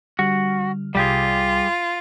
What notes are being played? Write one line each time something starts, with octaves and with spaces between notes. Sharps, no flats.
D3 G3 F#4 F6
C2 G3 F4 G4 G#4 D5 A6